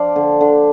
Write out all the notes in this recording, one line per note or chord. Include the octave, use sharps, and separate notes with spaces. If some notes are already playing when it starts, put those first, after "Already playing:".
Already playing: F3 D4 C5 D5 F5
D3
D3